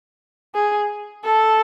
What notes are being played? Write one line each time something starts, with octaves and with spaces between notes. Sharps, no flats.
G#4
A4